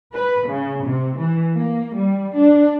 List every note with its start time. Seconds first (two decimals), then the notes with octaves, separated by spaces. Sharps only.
0.12 B4
0.47 C#3
0.85 C3
1.18 E3
1.54 A#3
1.95 G3
2.35 D4